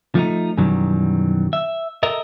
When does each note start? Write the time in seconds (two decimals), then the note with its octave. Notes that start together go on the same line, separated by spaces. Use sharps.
0.15 F3 A3 B3 D#4
0.58 F#2 B2 D#3 E3 F#3 G3
1.53 E5
2.03 A4 A#4 D#5 E5